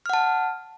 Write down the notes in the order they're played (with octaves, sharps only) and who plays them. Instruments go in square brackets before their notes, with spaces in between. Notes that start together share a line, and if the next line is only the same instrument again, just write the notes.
[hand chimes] F6
F#5
A5